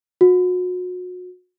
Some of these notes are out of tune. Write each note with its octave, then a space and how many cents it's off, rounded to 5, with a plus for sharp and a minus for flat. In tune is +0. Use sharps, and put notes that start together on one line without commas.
F#4 -35